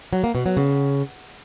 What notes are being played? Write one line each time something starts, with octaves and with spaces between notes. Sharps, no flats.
F#3
A#3
B2
F#3
C#3